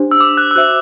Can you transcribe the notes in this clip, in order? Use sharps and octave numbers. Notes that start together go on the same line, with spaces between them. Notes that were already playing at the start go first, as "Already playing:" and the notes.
Already playing: D4 G4 C5
E6
D6
F#6
E6
F#4 C5 E5 F#6